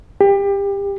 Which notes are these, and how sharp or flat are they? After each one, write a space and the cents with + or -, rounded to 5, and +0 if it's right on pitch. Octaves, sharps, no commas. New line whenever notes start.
G4 +25